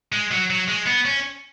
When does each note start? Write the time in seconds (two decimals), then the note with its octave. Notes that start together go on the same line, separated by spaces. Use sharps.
0.12 G#3
0.31 F#3
0.50 F#3
0.68 G#3
0.86 B3
1.05 C#4